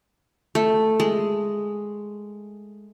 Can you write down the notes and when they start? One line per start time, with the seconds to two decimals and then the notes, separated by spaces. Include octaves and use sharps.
0.55 A3
1.00 G#3